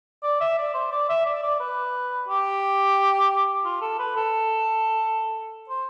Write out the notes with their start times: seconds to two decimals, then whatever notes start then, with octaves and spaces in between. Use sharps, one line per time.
0.23 D5
0.41 E5
0.58 D5
0.74 C5
0.92 D5
1.10 E5
1.26 D5
1.43 D5
1.60 B4
2.29 G4
3.65 F4
3.81 A4
3.99 B4
4.16 A4
5.69 C5